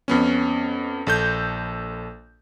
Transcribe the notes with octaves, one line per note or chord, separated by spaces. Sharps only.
F2 B3 C#4
A#1 A4 G6